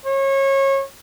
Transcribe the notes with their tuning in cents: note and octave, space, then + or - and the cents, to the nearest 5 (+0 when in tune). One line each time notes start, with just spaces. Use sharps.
C#5 -30